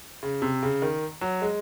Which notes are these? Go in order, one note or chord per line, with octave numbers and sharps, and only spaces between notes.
C#3
C3
C#3
D#3
F#3
G#3